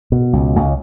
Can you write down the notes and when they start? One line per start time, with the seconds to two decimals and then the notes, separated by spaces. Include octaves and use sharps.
0.12 B2
0.33 C#2
0.55 C#2